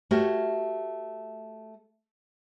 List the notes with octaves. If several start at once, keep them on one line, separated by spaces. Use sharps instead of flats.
A3 F#4 G4 A#4 C#5